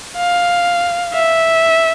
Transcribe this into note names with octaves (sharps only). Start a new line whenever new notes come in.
F5
E5